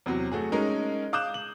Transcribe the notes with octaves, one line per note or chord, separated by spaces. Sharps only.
E2 C3 F#3
F#3 A3 F#4 G#4
G#3 C#4 D#4 A#4
F5 D6 D#6 F#6 G6 E7
F#7